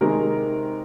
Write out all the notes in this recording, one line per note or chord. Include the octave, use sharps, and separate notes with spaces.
C3 D#3 G#3 A#4